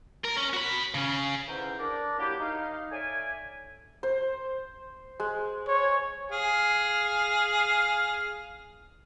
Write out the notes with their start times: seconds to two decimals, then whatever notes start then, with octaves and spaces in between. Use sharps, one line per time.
0.24 A#4
0.37 C#4
0.53 F#4 B5
0.94 C#3 C#4
1.47 E2 G#2 D3 C#4 G5 A#5
1.79 D4 A#4 D5
2.19 F#3 A#3 E4 G4
2.40 D#4 F5
2.92 A4 C#5 D5 E5 G#5
4.03 C5
5.20 G#3
5.68 C#5
6.31 G#4 F5